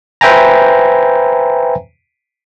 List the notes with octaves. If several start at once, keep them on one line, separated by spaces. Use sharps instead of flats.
B4 C5 E5 G5 G#5 A#5